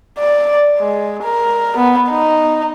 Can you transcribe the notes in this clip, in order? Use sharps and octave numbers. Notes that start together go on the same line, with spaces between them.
D5
G#3
A#4
B3
D#4